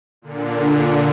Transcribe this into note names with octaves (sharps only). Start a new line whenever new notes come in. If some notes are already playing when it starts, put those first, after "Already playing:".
A#2 D3